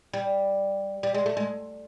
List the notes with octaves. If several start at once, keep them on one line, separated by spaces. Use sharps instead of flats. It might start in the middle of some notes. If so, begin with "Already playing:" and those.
G3
G3
G#3
A3
G#3